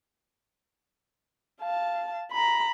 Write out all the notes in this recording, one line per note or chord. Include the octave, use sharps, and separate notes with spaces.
F5 A5
A#5 B5